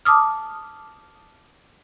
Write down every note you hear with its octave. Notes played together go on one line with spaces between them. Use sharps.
A5 D6 D#6 F6